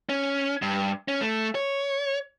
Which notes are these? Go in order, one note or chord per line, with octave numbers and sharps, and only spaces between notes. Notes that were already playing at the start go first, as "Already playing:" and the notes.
C#4
G2
C#4
A3
C#5